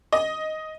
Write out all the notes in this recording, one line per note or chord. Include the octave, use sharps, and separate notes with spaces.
D#5